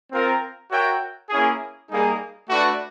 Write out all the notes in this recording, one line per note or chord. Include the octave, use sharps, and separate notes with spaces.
C4 F4 A#4
F#4 A#4 C#5 E5 G5
A#3 C#4 E4 G#4
G3 A#3 D#4 G#4
A3 D4 F#4 B4 D5